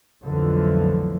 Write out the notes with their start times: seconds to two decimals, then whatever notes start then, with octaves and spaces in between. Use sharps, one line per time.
0.23 B1 F2 D3 E3 F3 A3